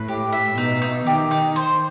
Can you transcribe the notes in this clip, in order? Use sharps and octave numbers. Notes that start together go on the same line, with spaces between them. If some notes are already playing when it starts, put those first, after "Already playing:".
Already playing: A2 B4
G4
E5
B2 D#4
D#4
D#3 G4
D#4
C5